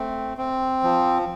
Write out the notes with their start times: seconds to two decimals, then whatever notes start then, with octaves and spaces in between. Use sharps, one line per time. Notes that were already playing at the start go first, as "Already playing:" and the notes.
Already playing: A3 C4
0.38 C4
0.83 F3